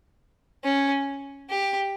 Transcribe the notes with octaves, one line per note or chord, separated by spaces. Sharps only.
C#4
G4